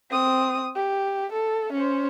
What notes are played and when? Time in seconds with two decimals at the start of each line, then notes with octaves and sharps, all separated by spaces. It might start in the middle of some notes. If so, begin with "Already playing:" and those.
0.10 C4 D#6
0.75 G4
1.32 A4
1.73 C#4 C5